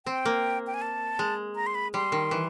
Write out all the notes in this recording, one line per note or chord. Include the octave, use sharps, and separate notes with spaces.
C4 G5
A#3
G5
G#5
A5
G#3
A#5
C6
B5
G3 C6
D#3
E3